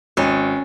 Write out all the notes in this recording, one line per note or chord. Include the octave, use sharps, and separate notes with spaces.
G#1 C#4